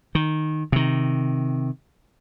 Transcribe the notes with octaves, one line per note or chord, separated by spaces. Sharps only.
D#3
C3 D#3